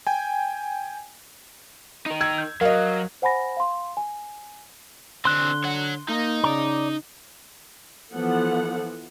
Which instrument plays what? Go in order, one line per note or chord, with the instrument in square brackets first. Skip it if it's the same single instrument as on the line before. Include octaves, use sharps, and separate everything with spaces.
[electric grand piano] G5 G#5
[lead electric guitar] D#4 A#4
[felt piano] E6 G#6
[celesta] G6
[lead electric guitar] F#3 [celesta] A#4 [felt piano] D#5 F5
[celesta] C5 F#5 G#5 B5 A#6
F5 C6
G#5
[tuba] D3 [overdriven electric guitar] C4 D4 [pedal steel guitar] C6 F#6
[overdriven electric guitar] C#5 F#5
[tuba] A#3 [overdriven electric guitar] D#4
[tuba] C#3 [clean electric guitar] D5 A#5
[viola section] E3 F3 B3 A4 F#5